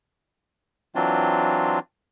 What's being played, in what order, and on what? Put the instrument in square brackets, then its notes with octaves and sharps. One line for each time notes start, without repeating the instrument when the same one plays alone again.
[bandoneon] E3 F#3 C4 D4 F4